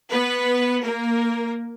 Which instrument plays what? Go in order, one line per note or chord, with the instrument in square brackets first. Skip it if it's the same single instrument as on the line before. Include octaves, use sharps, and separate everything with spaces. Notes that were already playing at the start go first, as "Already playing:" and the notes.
[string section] B3 B4
A#3 A#4